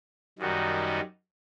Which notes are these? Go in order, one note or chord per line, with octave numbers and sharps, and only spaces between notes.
F#2 D#3 G3 D#4 F#4